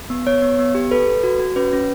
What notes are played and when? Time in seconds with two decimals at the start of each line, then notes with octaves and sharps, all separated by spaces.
0.10 B3
0.27 B3 C#5
0.42 B3
0.59 B3
0.75 G4
0.91 A4 B4
1.07 A4
1.24 F#4
1.40 F#4
1.56 C#4 B4
1.73 C#4